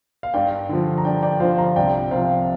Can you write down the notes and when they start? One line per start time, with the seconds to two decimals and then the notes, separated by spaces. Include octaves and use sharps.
0.23 F5
0.34 G2 D5 G5
0.69 D3 F3
0.98 A#5
1.05 G2 D5 G5
1.23 D5 G5
1.40 D3 F3 C5 F5
1.58 F5 A#5
1.76 C2 D5 G5
2.11 C3 F3 C5 F5